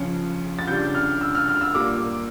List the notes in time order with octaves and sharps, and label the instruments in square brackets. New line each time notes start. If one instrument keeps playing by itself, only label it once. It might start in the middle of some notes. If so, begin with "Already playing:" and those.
Already playing: [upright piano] C#2 C#3 F3 C#4
A6
C#2 C#3 G3 D4 G6
F6
E6
F6
F6
E6
A#2 G3 A#3 D6